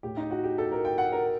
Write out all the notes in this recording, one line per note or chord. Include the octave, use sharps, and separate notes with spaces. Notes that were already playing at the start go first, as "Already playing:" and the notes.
A2 G4
D#4
F#4
G4
A4
A#4
G5
F#5
A#4